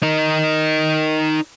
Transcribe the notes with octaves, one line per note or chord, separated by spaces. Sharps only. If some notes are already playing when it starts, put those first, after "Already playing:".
D#4 A#4